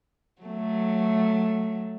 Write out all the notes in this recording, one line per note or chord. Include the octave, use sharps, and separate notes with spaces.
F#3 A3